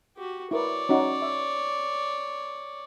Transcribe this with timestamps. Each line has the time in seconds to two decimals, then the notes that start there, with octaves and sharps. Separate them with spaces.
0.17 F#4 G4
0.51 E4 A#4 B4 C#5 D5
0.89 C#4 D#4 F#4
1.22 E5